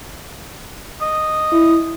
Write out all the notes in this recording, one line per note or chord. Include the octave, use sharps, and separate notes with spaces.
D#5
E4